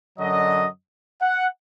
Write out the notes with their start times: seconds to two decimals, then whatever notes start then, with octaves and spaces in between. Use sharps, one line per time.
0.19 F#2 D3 F#3 D#5
1.22 F#5